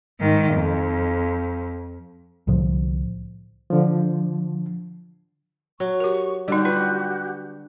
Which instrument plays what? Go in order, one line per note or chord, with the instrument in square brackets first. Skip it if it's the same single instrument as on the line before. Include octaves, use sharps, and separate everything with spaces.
[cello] G#2 D#3
F2
[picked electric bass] C2 A2 D3 F3
[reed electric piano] D3 F3
[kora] F#3 [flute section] C#6
[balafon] G4 A#4
[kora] D3 [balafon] G3 D#4 [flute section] F#4 G4 F#6
[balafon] F4 [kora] B4